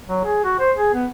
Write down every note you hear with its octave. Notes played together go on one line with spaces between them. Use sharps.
F#3
G#4
F#4
C5
G#4
B3